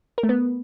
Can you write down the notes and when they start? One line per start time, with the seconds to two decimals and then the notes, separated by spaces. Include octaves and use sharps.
0.18 A#4
0.23 A3
0.29 B3